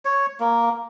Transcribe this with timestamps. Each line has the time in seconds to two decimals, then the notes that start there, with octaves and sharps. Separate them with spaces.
0.05 C#5
0.40 A#3